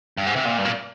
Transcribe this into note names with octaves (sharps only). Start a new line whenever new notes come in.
G2
G#2
C3
A#2
G2
A#2